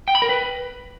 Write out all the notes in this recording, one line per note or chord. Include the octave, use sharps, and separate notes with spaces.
G5
B5
A#4
B4